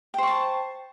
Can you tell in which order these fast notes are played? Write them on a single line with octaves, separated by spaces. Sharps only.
G5 C5 C#6 A5